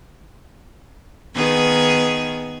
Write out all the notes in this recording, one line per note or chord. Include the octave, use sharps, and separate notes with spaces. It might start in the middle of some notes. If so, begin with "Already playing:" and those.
D#3 B3 G#4